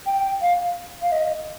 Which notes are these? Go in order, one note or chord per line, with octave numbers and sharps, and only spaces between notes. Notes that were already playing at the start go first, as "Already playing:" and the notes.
G5
F5
F5
D#5